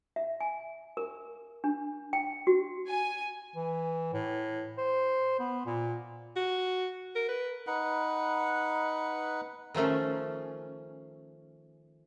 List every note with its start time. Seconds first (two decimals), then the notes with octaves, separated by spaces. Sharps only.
0.16 E5
0.41 G#5
0.97 A#4
1.64 D4
2.13 G5
2.47 F#4
2.87 G#5
3.56 E3
4.13 A2
4.78 C5
5.40 B3
5.66 A#2
6.36 F#4
7.16 A#4
7.29 B4
7.67 D#4 B4 F#5
9.74 D#3 F3 A3 C#4